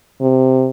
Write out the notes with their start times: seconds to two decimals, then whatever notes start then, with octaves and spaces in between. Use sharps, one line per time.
0.21 C3